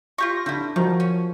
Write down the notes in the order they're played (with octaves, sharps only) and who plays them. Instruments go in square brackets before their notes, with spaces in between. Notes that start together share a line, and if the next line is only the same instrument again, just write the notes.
[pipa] F4 G4 C#6 [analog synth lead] A#6
[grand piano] D3 [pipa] G3 E4
[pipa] D#3 [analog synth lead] F3 [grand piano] F4 F#4 A#4
[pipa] C#4